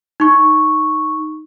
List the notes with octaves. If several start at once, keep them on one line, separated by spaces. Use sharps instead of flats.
D#4 C#6